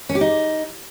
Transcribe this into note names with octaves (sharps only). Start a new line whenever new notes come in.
C#4
G4
D#4